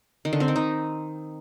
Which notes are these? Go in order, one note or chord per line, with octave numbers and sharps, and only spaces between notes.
D#3
D3
C4
D#3
D#4